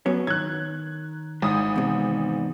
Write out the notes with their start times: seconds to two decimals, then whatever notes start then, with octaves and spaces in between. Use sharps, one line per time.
0.06 F#3 B3 C#4
0.27 D#3 F#6 G#6
1.42 G#1 G#2 D#6
1.76 E2 C3